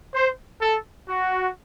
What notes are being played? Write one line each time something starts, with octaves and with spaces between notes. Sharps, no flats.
C5
A4
F#4